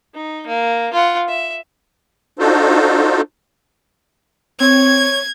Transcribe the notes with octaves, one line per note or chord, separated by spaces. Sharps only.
D#4
A#3
F4 F#5
E5
D4 D#4 F4 F#4 A4 C5
C4 C#5 G#6